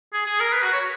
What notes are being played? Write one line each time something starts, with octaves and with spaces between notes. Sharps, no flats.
G#4
G#4
A#4
B4
F#4
C#5